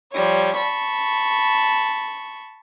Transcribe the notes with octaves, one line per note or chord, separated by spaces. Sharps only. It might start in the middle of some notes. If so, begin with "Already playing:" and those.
F3 G3 C#5
A5 B5 C#6